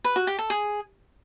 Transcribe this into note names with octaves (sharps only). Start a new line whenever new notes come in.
B4
F#4
G4
A4
G#4